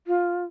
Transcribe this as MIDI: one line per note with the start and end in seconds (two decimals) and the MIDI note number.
0.07 0.43 65